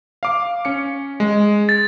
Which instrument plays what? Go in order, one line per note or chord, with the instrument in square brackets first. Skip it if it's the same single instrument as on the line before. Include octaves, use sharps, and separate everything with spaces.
[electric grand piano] F5 D6
C#4 C#7
G#3
[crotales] A6